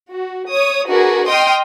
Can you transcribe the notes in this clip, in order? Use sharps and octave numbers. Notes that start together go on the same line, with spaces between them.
F#4
C#5 D#6
D4 F#4 G#4 A#4 B4
D#5 G5 C6 D#6 F6